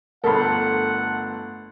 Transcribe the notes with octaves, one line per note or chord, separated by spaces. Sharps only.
G1 A3 B3 A4 A#4 F#5 B5 C6